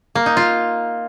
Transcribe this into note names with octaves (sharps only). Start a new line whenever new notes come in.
A#3
D#4
F4